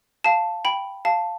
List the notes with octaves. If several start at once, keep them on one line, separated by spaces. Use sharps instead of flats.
F5 A5
G5 B5
F5 A5